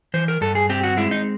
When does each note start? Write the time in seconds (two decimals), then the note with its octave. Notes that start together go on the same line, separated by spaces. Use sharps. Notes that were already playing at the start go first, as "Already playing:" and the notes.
0.14 E3 C5
0.28 A#4
0.41 G2 A4
0.55 G#4
0.69 C4 G4
0.84 F#4
0.97 G#3 E4
1.11 D#4